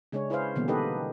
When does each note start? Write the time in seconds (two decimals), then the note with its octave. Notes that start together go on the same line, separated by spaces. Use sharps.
0.12 C#3 G#3 C#4 D4 C#5
0.30 E4 G#4 B4 C5 F5
0.56 B2 D3 E3 G3 A#3 B3
0.68 D#4 G4 A4 B4 D#5